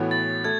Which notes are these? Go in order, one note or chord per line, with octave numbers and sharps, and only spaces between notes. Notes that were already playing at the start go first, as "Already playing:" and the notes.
Already playing: A2 E3 B3 F#4 C#5
A6
A3 G#6